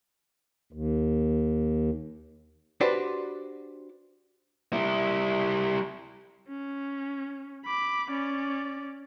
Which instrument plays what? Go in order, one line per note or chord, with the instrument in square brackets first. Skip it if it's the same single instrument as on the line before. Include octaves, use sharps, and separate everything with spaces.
[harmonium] D#2
[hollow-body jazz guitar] D4 F#4 G4 B4 C5
[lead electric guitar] G3 E4
[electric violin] C#4
B5 D6
C#4 D5